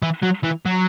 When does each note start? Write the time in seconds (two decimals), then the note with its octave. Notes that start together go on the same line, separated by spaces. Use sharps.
0.03 E3
0.23 F#3
0.44 E3
0.66 F#3